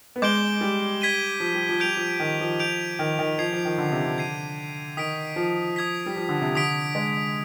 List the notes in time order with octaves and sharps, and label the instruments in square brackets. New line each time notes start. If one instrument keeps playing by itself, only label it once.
[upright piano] B3
[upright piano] G#3 [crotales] D6 G6 D7 G7
[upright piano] G3
[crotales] G#6 B6 D#7 G7
[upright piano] F3
G3
F3
[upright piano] G3 [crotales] G6 D7 F7
[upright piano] F3
D#3
F3
[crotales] G6 D7 F7
[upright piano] D#3
D#3
[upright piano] F3 [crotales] G#6 C7 F7
[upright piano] F3
D#3
D3
C3
D3
[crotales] G#6 C7 D#7
[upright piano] D#3 [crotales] D#6 B6 D7
[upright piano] F3
[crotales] D#6 G#6 B6
[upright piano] G3
F3
D3
C3
[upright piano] D3 [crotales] D#6 B6 D7
[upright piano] G#3